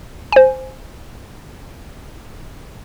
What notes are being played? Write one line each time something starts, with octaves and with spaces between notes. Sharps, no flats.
C5 G#5